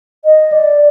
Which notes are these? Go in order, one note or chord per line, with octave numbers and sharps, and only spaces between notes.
D#5
D5